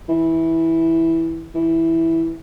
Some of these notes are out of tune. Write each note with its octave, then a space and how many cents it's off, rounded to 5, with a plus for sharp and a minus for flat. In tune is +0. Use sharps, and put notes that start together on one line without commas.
E3 -10
E3 -5